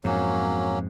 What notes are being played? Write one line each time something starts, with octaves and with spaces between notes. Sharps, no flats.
F2 G#2 F#3 A#3 C#4